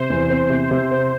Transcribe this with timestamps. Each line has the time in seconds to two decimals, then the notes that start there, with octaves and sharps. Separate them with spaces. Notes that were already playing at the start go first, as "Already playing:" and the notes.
Already playing: C3 C5
0.10 E2
0.30 C4
0.50 C3
0.71 C3
0.91 C4